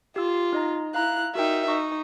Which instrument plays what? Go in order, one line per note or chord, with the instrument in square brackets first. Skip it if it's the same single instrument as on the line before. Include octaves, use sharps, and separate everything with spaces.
[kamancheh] F4 [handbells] G4 E6
[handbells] D#4 D#5 A#5
[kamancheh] E4 F#6 [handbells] F5 A#5
[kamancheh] D#4 E5 [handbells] F#4 A#4 G5
[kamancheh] D#4 [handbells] C#6